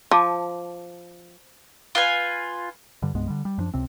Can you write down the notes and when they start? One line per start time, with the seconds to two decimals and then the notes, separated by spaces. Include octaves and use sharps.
0.11 F3 A5 D6
1.95 F4 B4 G#5
3.02 G2 D3 G3
3.14 C2 G2 G#3 B3
3.28 D3 G3
3.45 G3
3.58 F#2 F3 D4
3.74 C#2 C3 C4